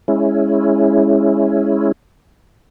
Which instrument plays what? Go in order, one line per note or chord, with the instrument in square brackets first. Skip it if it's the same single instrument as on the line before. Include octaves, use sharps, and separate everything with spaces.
[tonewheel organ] G#3 C#4 E4